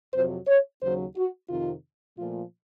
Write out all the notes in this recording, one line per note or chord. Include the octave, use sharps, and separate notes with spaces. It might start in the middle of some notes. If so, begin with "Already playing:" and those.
F2 C3 F#3 C5
C#5
D#2 C#3 F#3 C5
F#4
F2 C3 D#3 F4
A#2 F3 A3 F4